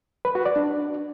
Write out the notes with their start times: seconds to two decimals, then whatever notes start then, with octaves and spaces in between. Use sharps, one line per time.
0.25 B4
0.35 F#4
0.45 D5
0.56 D4